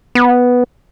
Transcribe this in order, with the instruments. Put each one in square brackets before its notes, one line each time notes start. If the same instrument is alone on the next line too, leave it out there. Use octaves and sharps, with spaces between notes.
[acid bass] B3